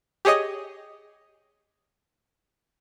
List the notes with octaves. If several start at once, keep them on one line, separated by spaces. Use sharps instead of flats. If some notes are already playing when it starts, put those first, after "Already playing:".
G4 G#4 C#5 D#5 D#6